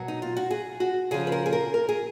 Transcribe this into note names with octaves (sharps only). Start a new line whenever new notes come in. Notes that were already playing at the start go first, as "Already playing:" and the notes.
Already playing: B2 F#3 A#4
D#4
F4
F#4
G#4
F#4
C#3 F3 G#4
B4
A#4
G#4
A#4
A#4
G#4